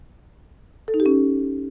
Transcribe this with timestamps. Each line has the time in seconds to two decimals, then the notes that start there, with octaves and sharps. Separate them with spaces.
0.88 A4
0.94 D#4
1.00 G4
1.06 C#4